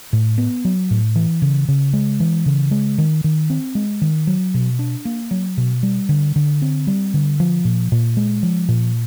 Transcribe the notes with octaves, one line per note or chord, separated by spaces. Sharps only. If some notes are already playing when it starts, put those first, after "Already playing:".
A2
B3
F#3
A2
E3
C#3
C#3
G#3
E3
C#3
G#3
D#3
D#3
C4
G#3
D#3
F#3
B2
D4
A#3
F#3
B2
G3
D3
D3
C4
G3
D3
F3
A#2
A#2
G#3
F3
A#2